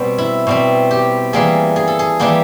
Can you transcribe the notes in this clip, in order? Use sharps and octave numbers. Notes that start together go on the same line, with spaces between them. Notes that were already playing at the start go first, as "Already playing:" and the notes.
Already playing: B2 G3 C4
E4
B2 G3 C4
G4
E3 G3 A#3 G#4
G#4
A4
G#4
E3 G3 A#3 G4